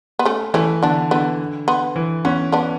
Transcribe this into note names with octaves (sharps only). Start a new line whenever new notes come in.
B3
A3 C#4
E3 A3 C#4
D3 B3 D4
D3 B3
B3
E3
B3 C#4
B3 D4